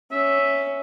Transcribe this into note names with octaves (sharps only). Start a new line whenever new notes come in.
C#4 E5